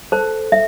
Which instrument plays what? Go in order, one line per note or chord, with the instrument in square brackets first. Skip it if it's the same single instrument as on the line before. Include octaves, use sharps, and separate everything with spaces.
[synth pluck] A4 [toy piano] C5
[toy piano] E5